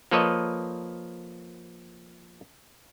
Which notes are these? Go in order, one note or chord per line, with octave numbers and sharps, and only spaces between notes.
F3 A#3 A4 B4 C#5 D#5